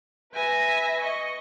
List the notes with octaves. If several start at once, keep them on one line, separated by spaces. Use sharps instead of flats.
B4 E5 G#5 A#6
D#5 C#6